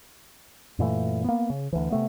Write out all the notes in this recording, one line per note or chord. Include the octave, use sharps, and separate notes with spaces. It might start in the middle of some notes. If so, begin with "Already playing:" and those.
F#2 A#2 E3 A3
A#3 B3
C#3
D2 E3
C3 A3 B3